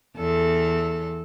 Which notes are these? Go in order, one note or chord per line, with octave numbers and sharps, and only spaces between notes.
E2 A4